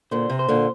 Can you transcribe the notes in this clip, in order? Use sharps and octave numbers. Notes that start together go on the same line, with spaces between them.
A#2 D3 C5
C3
C5
A#2 D3